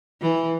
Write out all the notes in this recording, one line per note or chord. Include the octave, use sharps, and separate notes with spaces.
E3